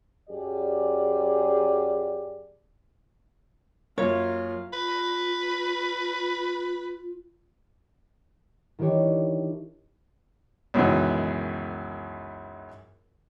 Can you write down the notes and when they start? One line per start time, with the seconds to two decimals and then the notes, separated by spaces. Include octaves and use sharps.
0.30 F#2 G4 G#4 D5
3.98 F#2 A#3 F4 C#5
4.73 F4 B4
8.79 D#3 E3 D4 G4 C#5
10.74 C#2 F#2 B2 D#3 E3